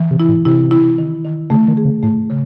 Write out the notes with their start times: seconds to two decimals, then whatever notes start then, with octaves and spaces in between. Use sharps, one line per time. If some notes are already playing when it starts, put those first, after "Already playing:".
Already playing: E3
0.11 C3
0.20 E4
0.29 A2
0.45 C3 E4
0.71 E4
0.98 D#3
1.25 D#3
1.50 C#3 A3
1.68 D#3
1.77 G#4
1.85 C#3
2.03 A2 A3
2.30 C#3